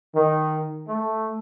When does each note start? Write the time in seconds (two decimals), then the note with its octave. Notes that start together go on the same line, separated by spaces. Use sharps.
0.14 D#3
0.88 A3